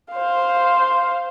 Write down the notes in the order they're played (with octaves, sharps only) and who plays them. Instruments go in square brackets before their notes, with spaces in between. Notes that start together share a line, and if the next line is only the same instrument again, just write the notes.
[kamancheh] C5 F5